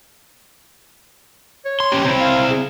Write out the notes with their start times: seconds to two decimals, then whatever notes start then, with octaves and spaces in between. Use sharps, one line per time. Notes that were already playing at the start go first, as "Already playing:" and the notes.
1.65 C#5
1.80 C6
1.92 C#4 G4
2.04 C4 E4 C#5
2.21 F5
2.51 G#4